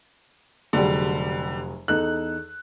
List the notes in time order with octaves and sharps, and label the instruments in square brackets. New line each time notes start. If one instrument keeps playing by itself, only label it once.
[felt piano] F1 F#3 G#4 [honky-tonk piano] D3 G3
[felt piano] E2 D#4 A4 [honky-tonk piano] F#6